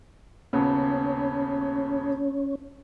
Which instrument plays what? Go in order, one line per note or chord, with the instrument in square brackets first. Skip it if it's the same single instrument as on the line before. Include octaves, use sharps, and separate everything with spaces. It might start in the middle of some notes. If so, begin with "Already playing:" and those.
[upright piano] D#1 C#3 B3 [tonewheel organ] C#4